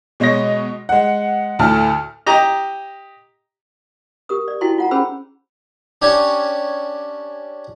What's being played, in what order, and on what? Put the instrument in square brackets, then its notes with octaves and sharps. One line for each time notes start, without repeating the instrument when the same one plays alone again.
[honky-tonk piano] B2 G#3 C#5 D#5 A#6
G#3 F#5
D2 A2 A5 F6
[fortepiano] G4 D#5 A#5
[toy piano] G4 A#4 D#6
D5
D#4 E4 F#4 G5 A5 C6
F4 F#5 A#5
C#4 G#4 C5 G5 B5 E6
[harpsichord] C#4 D4 G4 G#5